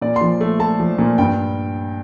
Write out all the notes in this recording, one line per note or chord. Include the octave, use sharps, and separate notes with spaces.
A#2 D5
C6
F3
A3
A3 A5
F3
A#2
G2 G5